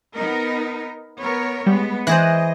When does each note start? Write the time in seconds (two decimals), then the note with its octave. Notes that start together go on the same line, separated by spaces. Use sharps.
0.15 B3 D#4 A#4
1.19 B3 A#4 C#5
1.66 G3 G#3 B3
2.07 E3 G#4 C5 D#5 F#6 A#6